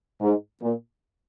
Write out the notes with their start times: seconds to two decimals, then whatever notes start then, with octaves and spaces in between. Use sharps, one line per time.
0.21 G#2
0.61 A#2